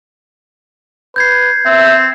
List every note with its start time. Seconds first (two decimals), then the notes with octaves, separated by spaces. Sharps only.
1.16 B4 G6 G#6 C7
1.66 C4 E5